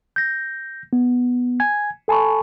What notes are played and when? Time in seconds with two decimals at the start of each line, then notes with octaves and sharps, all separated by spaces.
0.16 G6 A#6
0.93 B3
1.60 G#5 G#6
2.08 A4 G#5 A5 B5 C#6